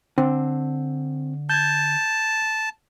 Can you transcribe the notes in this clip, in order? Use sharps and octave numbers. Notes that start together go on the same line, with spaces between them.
D3 C4
A5 G6 G#6